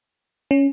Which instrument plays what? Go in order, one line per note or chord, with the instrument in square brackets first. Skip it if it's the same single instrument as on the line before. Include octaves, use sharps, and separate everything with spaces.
[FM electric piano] C#4